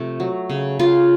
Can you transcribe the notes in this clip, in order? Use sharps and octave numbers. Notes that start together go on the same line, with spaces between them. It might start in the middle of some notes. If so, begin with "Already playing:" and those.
Already playing: C3 F3 A3
F#3
C#3
C#3 F4